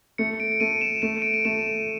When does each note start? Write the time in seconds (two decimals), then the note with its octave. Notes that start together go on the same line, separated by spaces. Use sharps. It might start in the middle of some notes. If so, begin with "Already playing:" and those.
0.18 A3 C#7
0.40 D7
0.52 D7
0.60 A3 D#7
0.81 E7
1.02 A3 D#7
1.22 D7
1.34 D#7
1.45 A3 E7